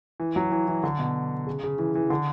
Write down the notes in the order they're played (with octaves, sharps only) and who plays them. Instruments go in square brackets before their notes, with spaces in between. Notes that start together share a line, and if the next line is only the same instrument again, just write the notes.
[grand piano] E3
F#3
E3
E3
D3
B2
C#3
C#3
E3
E3
D3